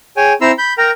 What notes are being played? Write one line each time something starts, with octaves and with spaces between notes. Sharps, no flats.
G#4 C#5 G5 G#5
C4 E4 A#5 C6 E6
B5 G6
A#4 G5 A#5